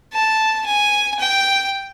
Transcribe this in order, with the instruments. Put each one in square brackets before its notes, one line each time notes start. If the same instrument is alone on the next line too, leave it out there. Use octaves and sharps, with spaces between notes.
[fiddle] A5
G#5
G5